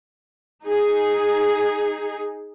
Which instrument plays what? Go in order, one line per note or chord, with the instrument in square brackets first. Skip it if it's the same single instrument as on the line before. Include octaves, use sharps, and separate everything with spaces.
[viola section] D#4 G#4